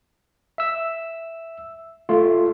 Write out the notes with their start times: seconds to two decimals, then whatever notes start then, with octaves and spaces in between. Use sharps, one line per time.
0.58 E5 E6
2.09 A3 F4